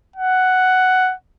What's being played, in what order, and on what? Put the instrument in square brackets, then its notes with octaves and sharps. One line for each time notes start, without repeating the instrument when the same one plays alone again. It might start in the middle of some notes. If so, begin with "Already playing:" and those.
[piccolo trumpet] F#5